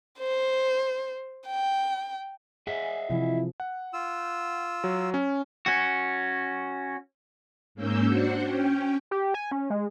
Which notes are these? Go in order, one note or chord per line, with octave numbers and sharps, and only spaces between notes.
C5
G5
G#4 D#5 E5 F#5
C3 E3 F3 E4
F#5
F4 E6
F#3
C#4
C#4 F#4
G#2 A#3 C#4 E6 G6
D4 F#4 C5 C#7
C#4 G5
G4
G#5
C#4
G#3